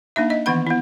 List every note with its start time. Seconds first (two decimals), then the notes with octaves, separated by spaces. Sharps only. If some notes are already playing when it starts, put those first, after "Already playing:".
0.16 A#3 D4 D#4 E5
0.30 D#5
0.46 D#3 E3 B3 F#5 B5
0.67 B3 E4